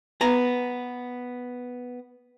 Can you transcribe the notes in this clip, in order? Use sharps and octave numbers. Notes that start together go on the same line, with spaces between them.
B3 A#5